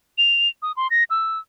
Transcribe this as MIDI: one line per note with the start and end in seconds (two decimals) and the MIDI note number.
0.18 0.48 101
0.62 0.72 87
0.77 0.87 84
0.90 1.04 94
1.10 1.39 88